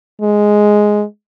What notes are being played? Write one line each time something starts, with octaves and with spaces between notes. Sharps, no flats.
G#3